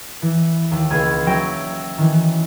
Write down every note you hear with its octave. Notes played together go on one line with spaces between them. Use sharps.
E3
D#2
C#2 A#3 B5 F6 G#6 D#7
F#3 C#4 E5 G5 A#6 D7
D#3 E3